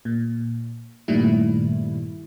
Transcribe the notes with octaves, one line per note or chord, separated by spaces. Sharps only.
A#2
G2 A#2 D#3 G3 A3 E4